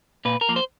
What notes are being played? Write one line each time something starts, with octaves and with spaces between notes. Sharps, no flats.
A#2 B4
A#4
F3 A#3
C5